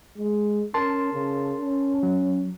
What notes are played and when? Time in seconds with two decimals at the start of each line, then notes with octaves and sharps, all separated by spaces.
0.18 G#3
0.74 C#4 A#4 A5 C6
1.12 C#3
1.58 C#4
2.03 F#3